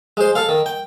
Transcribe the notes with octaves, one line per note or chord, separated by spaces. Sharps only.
G#3 C5
A4 F5
D#3
G5